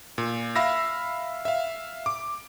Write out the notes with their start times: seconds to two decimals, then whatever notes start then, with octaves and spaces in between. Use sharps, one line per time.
0.18 A#2
0.56 E5 F5 B5 E6 A#6
1.45 E5 F5
2.06 D6